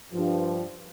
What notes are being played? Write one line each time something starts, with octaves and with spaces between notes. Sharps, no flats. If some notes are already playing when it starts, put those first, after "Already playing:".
G2 F3